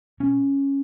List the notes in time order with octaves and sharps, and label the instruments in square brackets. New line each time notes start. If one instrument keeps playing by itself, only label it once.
[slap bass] B2 C#4